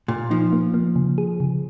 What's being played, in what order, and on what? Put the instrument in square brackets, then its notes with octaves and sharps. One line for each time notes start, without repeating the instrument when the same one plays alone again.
[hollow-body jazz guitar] A#2 [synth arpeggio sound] A#3
[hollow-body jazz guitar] F3 [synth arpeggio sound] D#4
[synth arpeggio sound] A#3
A#3
C#3
G#4
C#3